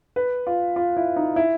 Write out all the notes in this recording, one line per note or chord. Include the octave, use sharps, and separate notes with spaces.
B4
F4
F4
E4
D#4
E4